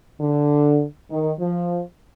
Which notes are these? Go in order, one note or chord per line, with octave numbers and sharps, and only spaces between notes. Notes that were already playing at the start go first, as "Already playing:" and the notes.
D3
D#3
F3